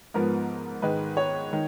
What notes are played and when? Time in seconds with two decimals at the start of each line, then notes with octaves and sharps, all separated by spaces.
0.14 G#2 F3 B3 A#4
0.82 G#2 D#3 G#3 B4
1.17 C#5
1.53 D#3